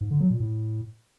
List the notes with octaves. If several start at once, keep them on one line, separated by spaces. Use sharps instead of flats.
G#2
D3
F#3
A#2
A2